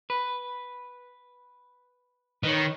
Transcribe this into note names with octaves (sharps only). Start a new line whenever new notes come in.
B4
D#3 B4 C#5